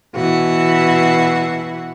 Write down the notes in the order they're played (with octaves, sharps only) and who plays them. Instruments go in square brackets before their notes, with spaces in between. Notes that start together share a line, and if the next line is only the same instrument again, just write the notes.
[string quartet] B2 E3 F#4